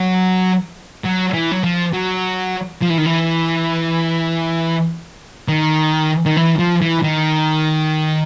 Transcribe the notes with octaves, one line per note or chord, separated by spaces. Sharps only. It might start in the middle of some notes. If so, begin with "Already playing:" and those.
Already playing: F#3
F#3
E3
F#3
F3
F#3
F3
E3
D#3
E3
D#3
D#3
E3
F3
E3
D#3